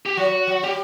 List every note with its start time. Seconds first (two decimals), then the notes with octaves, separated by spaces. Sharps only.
0.06 G4
0.17 F#3 F#4
0.47 F#3
0.63 G3 G4